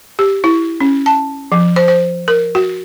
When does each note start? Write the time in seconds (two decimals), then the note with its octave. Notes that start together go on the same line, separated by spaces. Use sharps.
0.19 G4
0.44 E4
0.80 C#4
1.06 A5
1.52 F3
1.76 C5
1.88 C5
2.28 A#4
2.55 F#4